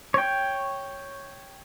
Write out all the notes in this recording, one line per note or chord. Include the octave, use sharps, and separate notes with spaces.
C#5 G5